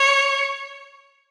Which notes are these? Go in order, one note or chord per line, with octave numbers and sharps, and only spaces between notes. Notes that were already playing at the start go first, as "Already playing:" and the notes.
Already playing: C#5